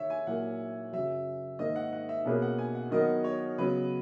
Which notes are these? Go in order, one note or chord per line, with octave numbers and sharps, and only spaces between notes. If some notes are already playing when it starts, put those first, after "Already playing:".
Already playing: D#3 C#5 E5
G#5
A#2 F#3 A#3 E4 F#5
F#2 C#3 F#3 E5
G#2 D#3 A#3 D#5
F#5
F#5
E5
B2 A#3 C#4 G#4 B4
F#5
G#5
F#5
D#3 F#3 B3 F#4 A#4 D#5
C#5
C#3 F#3 B3 B4